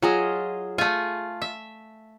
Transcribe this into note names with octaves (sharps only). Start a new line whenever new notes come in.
F#3 F4 G#4 D#5
A3 F4 G#5
E5